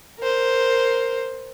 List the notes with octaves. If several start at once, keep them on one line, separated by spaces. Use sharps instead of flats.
A#4 C5